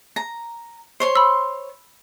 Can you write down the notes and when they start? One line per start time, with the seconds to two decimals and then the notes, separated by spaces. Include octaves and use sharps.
0.16 A#5
1.00 C5 C#5 C6
1.15 B5 E6